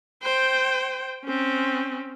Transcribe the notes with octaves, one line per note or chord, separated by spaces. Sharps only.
C5 G5
C4 C#4